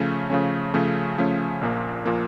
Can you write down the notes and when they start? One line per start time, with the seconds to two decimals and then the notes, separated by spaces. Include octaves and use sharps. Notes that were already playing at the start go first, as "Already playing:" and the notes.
Already playing: C#3 F3 A3 C#4
0.30 C#3 F3 A3 C#4
0.74 C#3 F3 A3 C#4
1.18 C#3 F3 A3 C#4
1.61 A#1 A#2 F3 A#3
2.05 A#2 F3 A#3